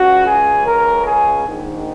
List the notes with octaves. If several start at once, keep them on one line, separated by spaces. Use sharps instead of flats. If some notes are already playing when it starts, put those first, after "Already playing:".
Already playing: C#2 C#3 F#4
G#4
A#4
G#4
A#1 G#2 D#3